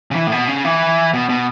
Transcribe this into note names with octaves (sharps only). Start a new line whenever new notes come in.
C#3
E3
A2
B2
C#3
E3
B2
B2